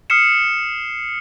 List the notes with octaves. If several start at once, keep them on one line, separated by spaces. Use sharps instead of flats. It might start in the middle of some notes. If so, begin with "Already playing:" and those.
D#6 F6 C7 C#7 E7